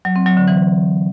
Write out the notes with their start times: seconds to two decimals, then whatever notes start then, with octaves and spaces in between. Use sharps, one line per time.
0.05 F#3
0.16 C4
0.26 F#3
0.37 D3
0.48 E3